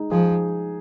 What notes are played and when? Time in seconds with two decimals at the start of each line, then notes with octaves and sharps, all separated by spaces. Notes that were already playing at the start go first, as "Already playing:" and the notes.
Already playing: G#3 D#4
0.11 F3 G#4